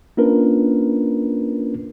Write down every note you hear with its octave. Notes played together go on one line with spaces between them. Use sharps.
A#3 C#4 D4 F4 A#4 B4